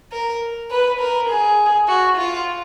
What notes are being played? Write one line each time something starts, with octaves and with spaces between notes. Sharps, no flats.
A#4
B4
A#4
G#4
F#4
F4